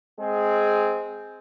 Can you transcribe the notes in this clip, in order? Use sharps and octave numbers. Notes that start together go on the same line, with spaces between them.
G#3 C4 G#4